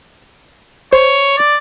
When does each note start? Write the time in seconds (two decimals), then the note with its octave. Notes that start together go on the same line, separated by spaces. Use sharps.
0.93 C5 C#5
1.38 D5